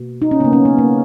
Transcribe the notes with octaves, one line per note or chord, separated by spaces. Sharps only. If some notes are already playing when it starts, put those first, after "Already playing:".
Already playing: B2 A#3
D#4
C#4
C#3 F#3 A#3 B3
C#4
B3
A#3